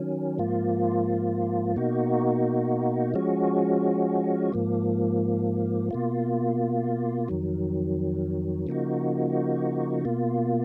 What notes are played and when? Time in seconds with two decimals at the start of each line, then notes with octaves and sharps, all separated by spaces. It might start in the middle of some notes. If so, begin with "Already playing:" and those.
Already playing: D#3 F#3 C#4
0.38 G#2 F3 A#3 F4
1.76 B2 A#3 D#4 F#4
3.14 F3 G#3 C#4 F#4
4.53 G#2 F3 A#3
5.91 B2 A#3 F4
7.28 F2 D#3 F#3
8.67 C#3 F3 A#3 D#4 F#4
10.05 B2 A#3 F4